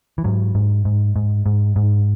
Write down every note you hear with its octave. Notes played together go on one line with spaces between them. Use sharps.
E3
G#2 F#3
G#2
G#2
G#2
G#2
G#2